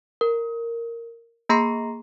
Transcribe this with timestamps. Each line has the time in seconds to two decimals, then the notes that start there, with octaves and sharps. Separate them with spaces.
0.21 A#4
1.49 A#3 G#4 A#5 C6 A#6 C7